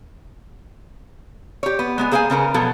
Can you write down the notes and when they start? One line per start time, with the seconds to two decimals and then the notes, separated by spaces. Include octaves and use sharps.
1.63 G4 C#5
1.79 B3
1.98 G#3 B3 G#5
2.11 A#3 G#4 C5 F5 F#5 G#5
2.30 C#3 C#4 A#4 B4
2.54 B2 F3 F#3 A4